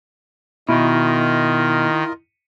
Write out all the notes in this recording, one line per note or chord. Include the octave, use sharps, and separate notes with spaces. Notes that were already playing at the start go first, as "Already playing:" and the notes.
B2 D#3 E4 F4 A#4 D#5